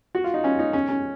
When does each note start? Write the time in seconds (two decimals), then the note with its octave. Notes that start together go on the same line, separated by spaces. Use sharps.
0.15 F#4
0.24 F4
0.34 D#4
0.44 C#4
0.59 D#4
0.73 C#4
0.89 C#4